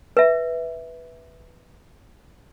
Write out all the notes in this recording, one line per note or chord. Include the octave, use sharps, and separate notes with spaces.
B4 E5